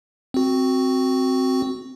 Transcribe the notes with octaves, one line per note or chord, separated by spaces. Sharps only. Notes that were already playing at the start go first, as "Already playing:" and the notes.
C4 F#4